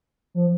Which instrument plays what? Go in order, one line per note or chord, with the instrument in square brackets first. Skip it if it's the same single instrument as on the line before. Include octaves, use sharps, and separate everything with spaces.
[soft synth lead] F3